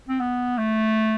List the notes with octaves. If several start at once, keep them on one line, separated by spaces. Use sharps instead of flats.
C4
B3
A3